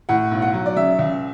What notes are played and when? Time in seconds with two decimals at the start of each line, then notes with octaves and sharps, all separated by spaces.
0.09 A2 F#5
0.31 B1
0.42 F#5
0.54 F#3
0.66 D5
0.76 C#3 E5
0.99 C#2